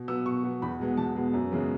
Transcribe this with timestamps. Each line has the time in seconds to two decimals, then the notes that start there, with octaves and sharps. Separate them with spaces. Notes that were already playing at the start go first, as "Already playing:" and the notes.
Already playing: B2
0.08 F#3 B3 E6
0.26 B2 C#6
0.43 F#3 B3
0.62 E2 B5
0.80 B2 G#3 B3
0.97 E2 A5
1.15 B2 G#3 B3
1.33 F#2
1.51 C#3 E3 G#3 B3